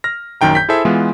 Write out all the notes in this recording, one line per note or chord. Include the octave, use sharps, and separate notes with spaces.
F6 A#6
A#1 F#2 D#3 G5 A#5
G6 B6
E4 G#4 A4 C5 E5
E3 G#3 B3 F4